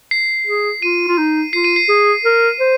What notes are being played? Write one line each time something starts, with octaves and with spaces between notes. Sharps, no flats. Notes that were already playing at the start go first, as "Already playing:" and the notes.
C7
G#4
F4 D#7
F4
D#4
F4 C7
D#7
C7
G#4
A#4
C5